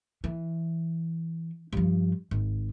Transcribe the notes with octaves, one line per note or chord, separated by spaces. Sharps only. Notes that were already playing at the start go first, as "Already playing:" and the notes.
E3
G2 F3
G#1